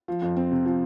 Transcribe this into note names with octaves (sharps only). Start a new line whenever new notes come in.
F3
F2
C4
C3
F3